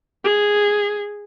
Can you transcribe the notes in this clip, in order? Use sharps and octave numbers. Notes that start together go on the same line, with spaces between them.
G#4